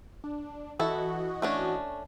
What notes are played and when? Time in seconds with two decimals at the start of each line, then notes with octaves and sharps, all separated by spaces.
0.24 D4
0.79 E3 E4 F#4 A4 D#5
1.42 A3 C#4 D4